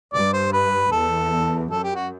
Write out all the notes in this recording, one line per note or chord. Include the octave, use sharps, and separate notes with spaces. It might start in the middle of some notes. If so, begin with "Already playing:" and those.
G2 D5
C5
B4
E2 A4
F#2 A4
G4
F#4